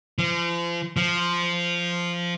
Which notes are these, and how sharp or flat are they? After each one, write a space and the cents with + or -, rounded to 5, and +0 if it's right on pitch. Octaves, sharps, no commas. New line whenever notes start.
F3 -35
F3 -5